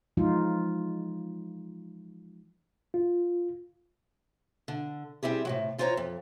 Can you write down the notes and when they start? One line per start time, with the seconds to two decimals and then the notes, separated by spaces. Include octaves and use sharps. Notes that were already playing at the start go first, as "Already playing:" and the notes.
0.17 E3 F3 G#3 D#4 F4
2.94 F4
4.68 D3
5.23 G3 C4 E4 G4 G#4
5.45 A2 C3 F#3
5.78 E3 F4 C5 C#5 F5 A#5
5.97 F2